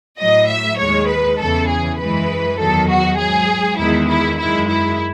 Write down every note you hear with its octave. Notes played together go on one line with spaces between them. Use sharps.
A2 F#3 D#5
E5
D#2 D#3 G#3 C#5
B4
E2 C#3 E3 A4
G#4
F#2 E3 G#3 B4
E2 D#3 F#3 A4
F#4
G#2 F#3 G#4
E2 D#3 G#3 E4
E4
F#2 D#3 G#3 E4
E4